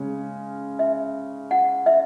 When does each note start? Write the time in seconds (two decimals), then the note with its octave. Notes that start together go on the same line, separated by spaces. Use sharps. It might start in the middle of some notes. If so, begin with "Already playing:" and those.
Already playing: C#3 G#3 C#4
0.79 E5
1.51 F#5
1.86 E5